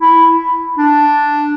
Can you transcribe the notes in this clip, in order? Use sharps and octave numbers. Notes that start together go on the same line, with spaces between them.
E4
D4